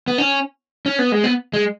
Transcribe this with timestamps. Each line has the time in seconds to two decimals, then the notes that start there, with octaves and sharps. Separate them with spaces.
0.08 B3
0.18 C#4
0.86 C#4
0.99 B3
1.12 G#3
1.24 B3
1.53 G#3